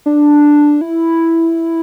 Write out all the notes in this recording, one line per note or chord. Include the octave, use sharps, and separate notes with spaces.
D4
E4